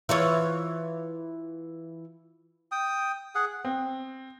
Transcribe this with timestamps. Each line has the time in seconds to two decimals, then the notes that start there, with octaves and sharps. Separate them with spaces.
0.09 E3 F4 C#5
2.72 G5 D#6
3.35 G#4 F#5
3.65 C4